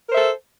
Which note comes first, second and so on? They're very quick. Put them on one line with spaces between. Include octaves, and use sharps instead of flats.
A#4 C5 E5 A4